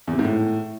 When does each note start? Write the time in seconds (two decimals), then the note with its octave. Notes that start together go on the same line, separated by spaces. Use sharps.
0.07 E2
0.13 C3
0.19 G#2
0.25 A2